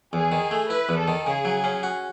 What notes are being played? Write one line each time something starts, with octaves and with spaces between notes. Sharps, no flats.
E2 G#4
D#3
A3
E4 B4
E2
A4
D#3
C#3 G#4
F#3
C#4
F#4